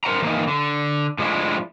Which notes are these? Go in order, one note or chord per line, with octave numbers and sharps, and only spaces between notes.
A#4 C5 F#5 A#5
E3 A#3 D#4
D3
A2 F3 G#3 D4 E4